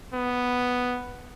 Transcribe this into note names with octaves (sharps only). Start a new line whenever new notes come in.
B3